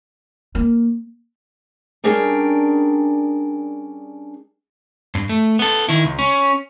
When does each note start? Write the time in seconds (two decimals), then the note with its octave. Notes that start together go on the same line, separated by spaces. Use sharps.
0.55 A#3
2.04 G3 C#4 D4 G#4 A#4 G5
5.15 G2
5.29 A3
5.59 B3 A4
5.89 D#3 E4
6.04 C#2
6.19 C#4